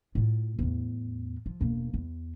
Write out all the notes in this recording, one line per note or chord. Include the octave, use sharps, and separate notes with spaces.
A2 F4
E2 A2
F3
E1 A#3
E2